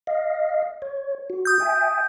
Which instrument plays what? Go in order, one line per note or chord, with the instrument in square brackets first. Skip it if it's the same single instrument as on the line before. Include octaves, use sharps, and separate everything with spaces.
[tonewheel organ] D#5 F5
C#5
F#4
[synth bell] D#6 G6
[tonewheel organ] E5 G5 G#5